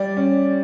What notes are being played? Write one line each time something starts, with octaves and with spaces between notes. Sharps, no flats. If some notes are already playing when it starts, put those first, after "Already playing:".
Already playing: G3 D5
C#4